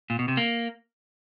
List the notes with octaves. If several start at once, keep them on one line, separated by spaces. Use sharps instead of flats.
A#2
B2
C3
A#3